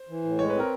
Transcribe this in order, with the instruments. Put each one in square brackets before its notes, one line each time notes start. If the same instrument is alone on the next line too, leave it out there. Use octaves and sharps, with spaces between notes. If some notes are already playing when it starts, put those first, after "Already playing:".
Already playing: [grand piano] C5
[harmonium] E3
A2
[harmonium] G#3 [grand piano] C#5
[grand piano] B4
[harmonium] C4 [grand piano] A#4